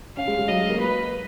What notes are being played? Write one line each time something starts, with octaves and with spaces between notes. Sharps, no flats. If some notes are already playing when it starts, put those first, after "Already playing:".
C#4 F5
G#3
G#3
F#3 D#5
G#3
A#3
B4